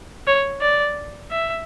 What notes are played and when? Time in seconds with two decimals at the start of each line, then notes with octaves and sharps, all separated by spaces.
0.27 C#5
0.61 D5
1.31 E5